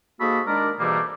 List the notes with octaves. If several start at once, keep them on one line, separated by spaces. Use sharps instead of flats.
G#2 A#3 F#4 A4 D#5 B5
D#3 G#3 D4 A#4 D5
G#2 B2 E3 G3 A3 A#3